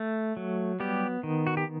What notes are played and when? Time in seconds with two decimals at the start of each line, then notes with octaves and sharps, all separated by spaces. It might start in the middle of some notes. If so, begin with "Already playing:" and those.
Already playing: A3
0.37 F#3
0.80 G3 B3 G4
1.23 D#3
1.47 F#4
1.57 G4